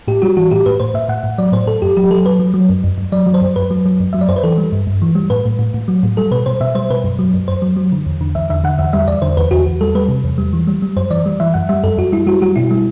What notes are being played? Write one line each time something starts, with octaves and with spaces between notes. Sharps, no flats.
A2 G4
G3 F#4
E3 F#4
A2 G4
A2 B4
A2 C5
A2 E5
A2 F#5
A2
F#3 D5
A2 C5
A2 A4
F#2 G4
F#3 G4
F#3 A4
F#3 B4
F#3
F#3
F#2
F#2
F#2
F#3 D5
F#3
C5
F#2
F#2 B4
F#3
F#3
F#2
F#3 E5
D5
F#2 C5
B4
E3 A4
G3
G2
G2
E3
G3
A2 B4
A2
A2
A2
F#3
A2
G3 A4
B2 B4
B2 C5
B2 E5
G3 C5
B2 B4
F#2
F#3
F#2
F#2 C5
F#3
F#3
D3
E2
D3
E2 E5
D3 E5
D3 F#5
E2 E5
G3 E5
E2 D5
D3 C5
E2 B4
E2 F#4
E2
G3 A4
G3 B4
C3
E2
G3
E3
G3
G3
F#2 C5
E3 D5
G3
E3 E5
F#2 F#5
G3 E5
F#2 A4
F#2 F#4
G3 E4
G3 F#4
G3 F#4
B2 E4
G3